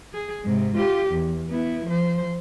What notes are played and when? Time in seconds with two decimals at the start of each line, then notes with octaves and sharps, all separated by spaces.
0.13 G#4
0.45 G#2 C3
0.76 F4 G4
1.11 E2
1.49 B3 E4
1.85 F3 C5